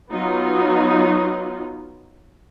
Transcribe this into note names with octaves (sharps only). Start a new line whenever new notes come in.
F#3 B3 D#4 F4